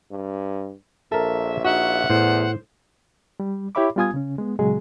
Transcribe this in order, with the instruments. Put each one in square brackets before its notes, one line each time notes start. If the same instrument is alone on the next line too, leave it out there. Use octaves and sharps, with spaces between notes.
[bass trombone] G2
[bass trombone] A#1 [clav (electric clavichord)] A4 A#4 [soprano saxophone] E5
[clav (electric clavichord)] D#4 F#4 [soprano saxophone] E5 [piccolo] F#5
[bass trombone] E2 [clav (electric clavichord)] A2 [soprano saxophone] C5
[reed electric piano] G3
E4 G4 C#5 E5 B5 D6
G3 B3 F4 G#5 D#6 G#6
C#3 C#4
G#3 B3
A#2 C#3 F#3 G#3 G#4